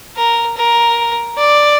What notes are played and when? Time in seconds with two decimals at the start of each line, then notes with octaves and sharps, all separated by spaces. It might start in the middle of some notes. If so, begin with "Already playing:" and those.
0.16 A#4
0.57 A#4
1.37 D5